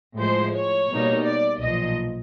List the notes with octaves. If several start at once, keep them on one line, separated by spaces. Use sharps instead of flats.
A2 F3 G#3 C5
C#5
B2 G3 A#3 D#4
D5
B1 A#2 F3 D#5